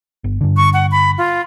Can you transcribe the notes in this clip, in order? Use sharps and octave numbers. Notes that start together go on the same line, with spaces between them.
G1
G2 D3
C#6
F#5
B5
F4